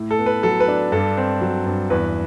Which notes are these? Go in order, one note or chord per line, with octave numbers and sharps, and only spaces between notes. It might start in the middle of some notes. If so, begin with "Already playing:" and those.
Already playing: A2
A4
B3
B4
F#3 A4
B4
D4
G2 A4
C4
F#3
G2
E2 B4